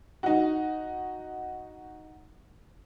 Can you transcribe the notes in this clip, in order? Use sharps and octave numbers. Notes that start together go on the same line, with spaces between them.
D#4 F#4